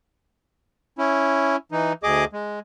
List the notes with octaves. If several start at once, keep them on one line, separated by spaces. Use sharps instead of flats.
C#4 E4
E3 D#4
D2 G#4 D#5 D6
G#3